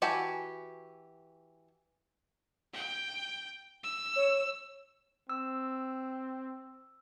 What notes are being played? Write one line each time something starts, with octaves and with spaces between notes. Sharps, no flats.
E3 F#4 G4 G#5 A5
G5
E6
C#5
C4 E6